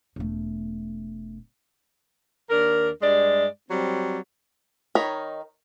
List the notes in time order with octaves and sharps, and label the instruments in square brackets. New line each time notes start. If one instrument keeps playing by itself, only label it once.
[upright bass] E1 A3
[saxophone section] D#2 D4 A#4
G2 G3 G#3 D5
F#3 G3 C4
[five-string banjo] D#3 D#4 A#4 C#5 B5